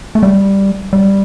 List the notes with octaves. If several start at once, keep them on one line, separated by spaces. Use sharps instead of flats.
A3
G3
G3